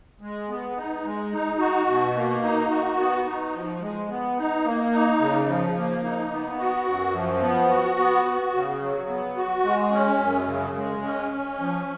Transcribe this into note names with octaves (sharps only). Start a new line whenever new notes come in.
G#3
B3
D#4
G#3
D#4
F#4
B2
A#3
D#4
F#4
B3
D#4
F3
G#3
B3
D#4
A#3
D#4
C#3
F3
A#3
D#4
B3
F#4
F#2
F3
B3
F#4
B3
F#4
C#3
F#3
B3
F#4
G#3
C#4
F#2
C#3
G#3
C#4
C#4
F3